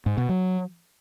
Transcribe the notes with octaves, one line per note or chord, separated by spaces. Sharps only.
G#2
B2
F#3